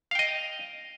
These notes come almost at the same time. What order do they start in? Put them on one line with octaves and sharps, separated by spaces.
F5 G5 D#5